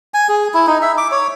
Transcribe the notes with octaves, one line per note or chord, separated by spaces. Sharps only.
G#5
G#4
E4
D#4
E5
D6
C#5